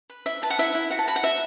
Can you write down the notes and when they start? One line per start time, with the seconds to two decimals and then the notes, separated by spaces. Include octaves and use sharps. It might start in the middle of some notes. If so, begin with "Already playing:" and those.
0.10 B4
0.26 E4 E5
0.42 B4 A5
0.50 F#5
0.59 E4 E5
0.75 E4
0.90 F#4 F#5
0.99 A5
1.07 F#4 B5
1.16 F#5
1.23 F#4 E5